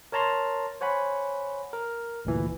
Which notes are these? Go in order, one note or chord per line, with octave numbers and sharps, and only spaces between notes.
A#4 C#5 A5 A#5 C6
C5 C#5 F#5 G#5 B5
A#4
G1 D2 A#2 E3